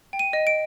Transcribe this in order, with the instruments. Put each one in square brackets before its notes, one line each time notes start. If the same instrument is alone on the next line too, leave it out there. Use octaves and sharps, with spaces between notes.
[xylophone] G5
D#7
D#5
D7